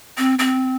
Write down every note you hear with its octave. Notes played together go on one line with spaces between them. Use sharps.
C4
C4